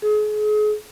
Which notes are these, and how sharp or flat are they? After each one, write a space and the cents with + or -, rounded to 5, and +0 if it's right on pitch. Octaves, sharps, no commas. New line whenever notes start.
G#4 +35